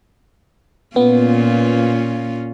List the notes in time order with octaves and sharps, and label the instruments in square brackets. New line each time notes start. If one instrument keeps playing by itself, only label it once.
[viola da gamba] A#2 C#4 F4 [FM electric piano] B3